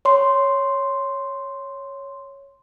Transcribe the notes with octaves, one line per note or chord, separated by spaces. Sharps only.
C#5 C6